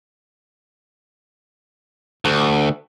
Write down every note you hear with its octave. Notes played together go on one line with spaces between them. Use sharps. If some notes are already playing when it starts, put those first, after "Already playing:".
D2